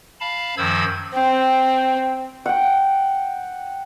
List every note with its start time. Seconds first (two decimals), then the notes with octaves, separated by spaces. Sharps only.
0.20 F5 A5 B5
0.57 F#2 D#3 F3 C5 E6 G#6
1.14 C4 G5
2.46 F#5 G5